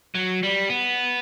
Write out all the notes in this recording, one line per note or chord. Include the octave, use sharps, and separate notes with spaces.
F#3
G3
B3